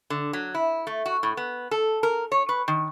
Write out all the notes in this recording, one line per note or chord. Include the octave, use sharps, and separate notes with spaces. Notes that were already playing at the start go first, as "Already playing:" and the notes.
D3
F#3
E4
A3
F#4
A2
B3
A4
A#4
C#5
B4
D#3